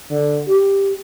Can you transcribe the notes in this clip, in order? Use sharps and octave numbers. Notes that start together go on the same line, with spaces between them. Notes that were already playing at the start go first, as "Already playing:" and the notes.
D3
G4